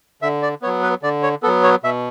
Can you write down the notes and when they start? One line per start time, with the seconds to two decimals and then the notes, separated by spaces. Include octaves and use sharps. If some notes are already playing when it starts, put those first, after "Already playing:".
0.22 D3 E5
0.43 D5
0.62 B3 C#5
0.66 F#3
0.83 B4
1.03 D3 D5
1.23 C#5
1.43 F#3 B3 A4
1.64 C#5
1.83 B2 E5